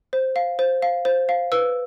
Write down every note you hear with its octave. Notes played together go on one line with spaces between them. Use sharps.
C5
F5
C5
F5
C5
F5
B4 E6